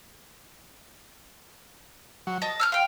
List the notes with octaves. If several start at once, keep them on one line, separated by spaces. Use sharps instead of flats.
F#3
D#5 A5
E6 F6 G6
F5 G5 C6